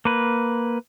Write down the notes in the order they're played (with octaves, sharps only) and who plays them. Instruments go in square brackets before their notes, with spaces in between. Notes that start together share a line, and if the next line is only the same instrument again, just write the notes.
[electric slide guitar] A#3 B4